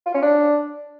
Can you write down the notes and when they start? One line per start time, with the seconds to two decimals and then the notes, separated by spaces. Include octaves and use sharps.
0.06 F4
0.14 C#4
0.22 D4